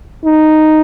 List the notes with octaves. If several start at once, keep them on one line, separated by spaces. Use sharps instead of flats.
D#4